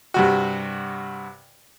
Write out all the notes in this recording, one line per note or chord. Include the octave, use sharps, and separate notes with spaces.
G2 C3 F#4